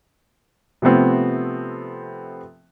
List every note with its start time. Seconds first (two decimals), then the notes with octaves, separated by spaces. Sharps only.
0.82 C3 F3 A3 B3 C4